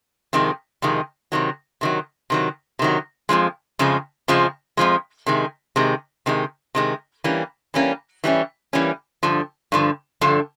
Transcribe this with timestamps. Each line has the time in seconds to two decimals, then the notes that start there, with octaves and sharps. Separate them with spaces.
0.33 F2 C3 D#3 G#3
0.82 F2 C3 D#3 G#3
1.32 C3 D#3 F#3
1.81 C3 D#3 F#3
2.30 C3 D#3 F#3
2.79 C3 D#3 F#3
3.29 F2 C#3 F3 G#3
3.79 F2 C#3 F3 G#3
4.28 F2 C#3 F3 G#3
4.77 F2 C#3 F3 G#3
5.26 C3 D#3 G#3
5.76 C3 D#3 G#3
6.26 C3 D#3 G#3
6.75 C3 D#3 G#3
7.24 E3 G3 A#3 C#4
7.74 E3 G3 A#3 C#4
8.24 E3 G3 A#3 C#4
8.73 E3 G3 A#3 C#4
9.23 G2 D3 F3
9.72 G2 D3 F3
10.21 G2 D3 F3